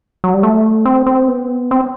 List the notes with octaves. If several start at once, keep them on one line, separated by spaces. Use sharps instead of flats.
F#3
G3
A3
C4
C4
B3
C4